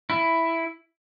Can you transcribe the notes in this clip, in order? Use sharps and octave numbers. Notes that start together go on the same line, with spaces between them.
E4